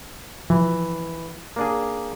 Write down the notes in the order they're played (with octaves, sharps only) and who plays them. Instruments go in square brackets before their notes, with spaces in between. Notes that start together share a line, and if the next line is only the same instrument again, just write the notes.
[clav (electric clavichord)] E3 [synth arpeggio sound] F3
[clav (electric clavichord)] A#3 D4 G#4